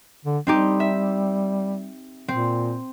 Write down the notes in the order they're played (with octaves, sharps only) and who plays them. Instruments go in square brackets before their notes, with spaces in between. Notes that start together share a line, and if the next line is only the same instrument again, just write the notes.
[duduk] D3
[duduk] G3 [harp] C4 D#4 G4
[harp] E5
[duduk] A#2 [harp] C4